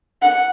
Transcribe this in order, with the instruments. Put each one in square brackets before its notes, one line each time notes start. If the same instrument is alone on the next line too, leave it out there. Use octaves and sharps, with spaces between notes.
[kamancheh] F#5